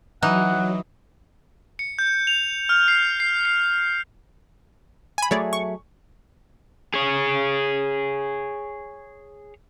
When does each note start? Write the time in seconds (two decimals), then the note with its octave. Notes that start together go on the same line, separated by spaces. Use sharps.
0.22 E3 F#3 D#4 F#5
1.79 C#7
1.99 G6
2.27 F7
2.69 F6
2.88 C7
3.20 C7
3.45 C7
5.18 G#5 B5
5.31 F#3 A3 G#4 C#5 D5 E5
5.53 C#6
6.94 G#4 C#5